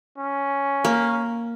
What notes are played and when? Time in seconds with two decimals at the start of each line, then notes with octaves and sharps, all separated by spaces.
0.18 C#4
0.85 A#3